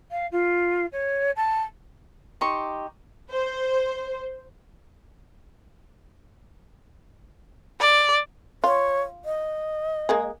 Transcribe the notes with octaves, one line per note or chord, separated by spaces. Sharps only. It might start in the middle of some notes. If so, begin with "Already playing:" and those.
F5
F4
C#5
A5
D#4 G4 C6 C#6
C5
D5
F4 C#5
D#5
G#3 A#3 G#4